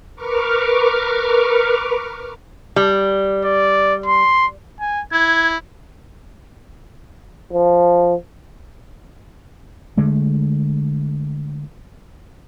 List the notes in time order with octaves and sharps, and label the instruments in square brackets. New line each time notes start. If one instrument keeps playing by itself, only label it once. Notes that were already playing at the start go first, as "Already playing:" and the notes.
[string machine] A#4 B4 C#6 D6 F6
[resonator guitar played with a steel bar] G3
[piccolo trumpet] D5
C6
G#5
[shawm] E4 [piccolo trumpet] G#6
[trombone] F3
[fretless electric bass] D3 G#3 A3